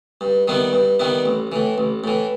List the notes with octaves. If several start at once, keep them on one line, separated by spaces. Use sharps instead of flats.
G2
D#3 G3 B3 E4
G2
D#3 G3 B3 E4
A1
A2 E3
A1
A2 E3